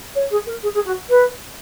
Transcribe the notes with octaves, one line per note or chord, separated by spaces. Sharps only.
C#5
G#4
A#4
G#4
G#4
F#4
B4